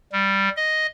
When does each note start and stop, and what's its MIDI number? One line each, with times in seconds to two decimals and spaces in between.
0.12 0.49 55
0.56 0.86 75